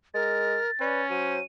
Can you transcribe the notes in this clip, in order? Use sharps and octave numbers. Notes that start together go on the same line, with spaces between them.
G#3 A#4 A6
C#4 B4 D5
F#3 C5 D#7